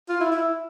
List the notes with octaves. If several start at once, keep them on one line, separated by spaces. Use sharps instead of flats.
F4
E4
E4